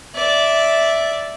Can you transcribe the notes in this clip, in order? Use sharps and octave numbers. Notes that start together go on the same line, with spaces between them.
D5 E5